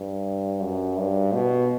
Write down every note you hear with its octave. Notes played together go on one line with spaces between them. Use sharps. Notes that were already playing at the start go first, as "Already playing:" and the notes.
Already playing: G2
F#2
G2
B2